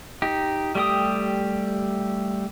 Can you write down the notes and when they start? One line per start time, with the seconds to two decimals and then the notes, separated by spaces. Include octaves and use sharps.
0.22 D#4 G4
0.75 G3 A3 G4 G5 D#6